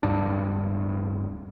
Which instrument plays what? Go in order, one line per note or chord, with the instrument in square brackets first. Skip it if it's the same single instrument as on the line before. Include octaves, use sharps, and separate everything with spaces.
[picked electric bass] D1 G#1 G2 D4